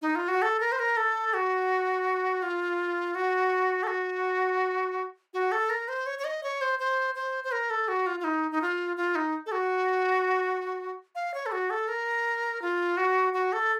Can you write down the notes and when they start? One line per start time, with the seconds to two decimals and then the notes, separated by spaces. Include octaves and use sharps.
0.02 D#4
0.15 F4
0.28 F#4
0.42 A4
0.60 A#4
0.72 C5
0.79 A#4
0.97 A4
1.34 F#4
2.42 F4
3.15 F#4
3.83 A4
3.87 F#4
5.34 F#4
5.52 A4
5.70 A#4
5.88 C5
6.06 C#5
6.19 C#5
6.24 D#5
6.43 C#5
6.61 C5
6.79 C5
7.15 C5
7.44 C5
7.52 A#4
7.70 A4
7.88 F#4
8.06 F4
8.20 F4
8.24 D#4
8.51 D#4
8.62 F4
8.97 F4
9.15 D#4
9.46 A4
9.52 F#4
11.15 F5
11.34 C#5
11.46 A4
11.52 F#4
11.70 A4
11.88 A#4
12.62 F4
12.97 F#4
13.33 F#4
13.53 A4